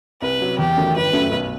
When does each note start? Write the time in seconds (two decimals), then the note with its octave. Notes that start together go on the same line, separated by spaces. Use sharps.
0.22 C2 B4
0.40 C3 F#3
0.58 E2 G4
0.77 D#3 F#3 A3
0.95 G1 B4
1.13 F#2 F#3 A3
1.31 B1